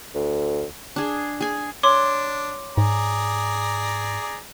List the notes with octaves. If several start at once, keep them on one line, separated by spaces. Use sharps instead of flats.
D2
D4 G#4
G#4 G#5
D4 C#5 C6 D6
G#2 G#4 D5 A#5